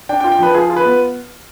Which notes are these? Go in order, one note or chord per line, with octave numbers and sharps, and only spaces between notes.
D4 G5
G5
F4
G5
F3 B4
F4 G#4
F4
B4
B3